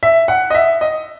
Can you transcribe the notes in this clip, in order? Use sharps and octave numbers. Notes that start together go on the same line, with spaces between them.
E5
F#5
D#5
E5
D#5